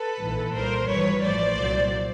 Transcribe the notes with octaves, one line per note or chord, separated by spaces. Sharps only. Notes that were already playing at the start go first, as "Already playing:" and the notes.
Already playing: A4 B4
A#1 G#2 E3
C2 A#2 G3 A#4 C5
G#1 G2 E3 G3 B4 C#5
A1 A2 F3 C5 D5
C2 A#2 F#3